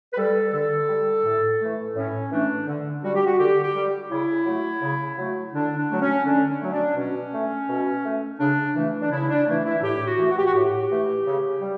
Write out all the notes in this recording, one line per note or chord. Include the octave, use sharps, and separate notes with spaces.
B4
G3 A4
D3 A4
G3
A2
E3 A3
A2 C#4
E3 A3 D4
D3
G3 F#4
G4
F#4
D3 G4
G4
G3
C#3 E4
F#3 A3
C#3
F#3 A3
D3 D4
D4
F#3 A3
C#4
D3 D4
C#4
F#3 A3
D4
B2 C#4
A3
B2
A3
C#3 D4
E3 A3
D4
C#3 E4
D4
E3 A3 E4
E4
A2 G4
F#4
E3 A3
F#4
G4
F#4
A2 G4
E3 A3
C#3
G3